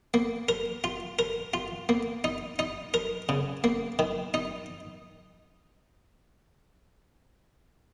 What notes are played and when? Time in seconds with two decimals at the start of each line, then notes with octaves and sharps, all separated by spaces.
0.14 A#3
0.49 A#4
0.84 F4
1.19 A#4
1.54 F4
1.89 A#3
2.24 D#4
2.59 D#4
2.94 A#4
3.29 C#3
3.64 A#3
3.99 D#3
4.34 D#4